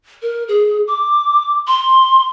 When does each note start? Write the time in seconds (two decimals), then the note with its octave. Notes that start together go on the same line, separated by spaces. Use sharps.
0.22 A#4
0.48 G#4
0.88 D6
1.68 C6